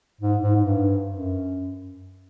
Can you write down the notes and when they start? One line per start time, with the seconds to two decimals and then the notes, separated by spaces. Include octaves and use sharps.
0.21 G#2
0.43 G#2
0.56 G#2
0.65 G2
1.09 F#2